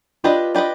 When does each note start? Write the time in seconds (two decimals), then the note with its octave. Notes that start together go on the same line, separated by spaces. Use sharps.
0.24 D4 F4 G4 B4 D#5
0.55 D4 G4 B4 D#5